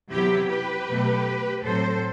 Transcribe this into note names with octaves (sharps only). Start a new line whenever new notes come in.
C3 F#3 B3 E4 G4
G4 B4
B2 F#3 A3
A2 F#3 C4 A4 C5